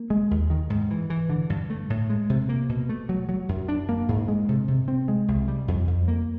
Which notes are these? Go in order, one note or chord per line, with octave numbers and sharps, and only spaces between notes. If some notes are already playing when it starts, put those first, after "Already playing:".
Already playing: A#3
G#3
D#2
D#3
G#2
E3
E3
D3
G2
A3
A2
G#3
C3
A#3
B2
A3
F#3
F#3
F#2
D4
A#3
G#2
G#3
C3
C3
C4
G#3
C2
G3
F2
F2
A#3